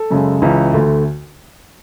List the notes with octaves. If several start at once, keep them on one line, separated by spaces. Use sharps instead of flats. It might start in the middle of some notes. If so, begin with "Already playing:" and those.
Already playing: A4
F#2 C#3 G#3
C#2 C#3 E3
D2 D3 A3